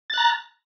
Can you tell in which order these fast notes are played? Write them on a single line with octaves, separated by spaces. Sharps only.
A6 F#6 A#5